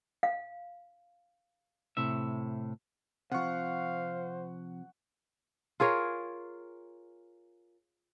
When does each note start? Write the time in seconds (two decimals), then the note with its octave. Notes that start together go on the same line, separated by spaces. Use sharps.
0.23 F5
1.97 A2 C3 E5
3.32 C3 F3 C5 F5 F#5 C#6
5.80 F4 G#4 A#4 C#5